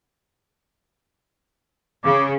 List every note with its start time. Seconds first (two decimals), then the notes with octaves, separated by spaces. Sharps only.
2.04 C#3 D6